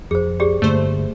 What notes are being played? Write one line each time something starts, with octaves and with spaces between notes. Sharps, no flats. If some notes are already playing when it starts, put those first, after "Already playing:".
F2 G#4 C5
G4 G#4 D5
G2 D3 A3 A#3 C5